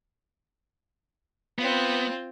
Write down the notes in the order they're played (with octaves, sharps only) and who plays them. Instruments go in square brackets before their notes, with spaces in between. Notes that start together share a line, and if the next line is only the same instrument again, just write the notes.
[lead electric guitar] B3 [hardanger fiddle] C4 F4